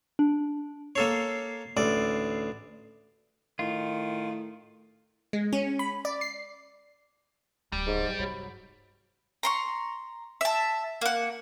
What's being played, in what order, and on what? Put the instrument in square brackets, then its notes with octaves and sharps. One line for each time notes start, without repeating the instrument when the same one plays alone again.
[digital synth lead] D4
[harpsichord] A#3 A4 C#5 [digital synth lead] C7
[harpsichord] A1 D2 D5
[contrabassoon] A2 [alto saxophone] D#3 [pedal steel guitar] F4
[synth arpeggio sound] G#3
C#4
B5
D5
C7
[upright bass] D1 D#2 [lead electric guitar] G3
[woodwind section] G#2
[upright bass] F#2
[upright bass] G2 C3 [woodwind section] F#3 B5
[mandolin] A#5 C6 C#6
E5 A5
A#3 F#5